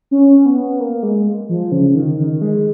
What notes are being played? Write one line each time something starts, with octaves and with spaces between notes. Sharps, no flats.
C#4
B3
A#3
G#3
F3
C#3
D#3
D#3
G#3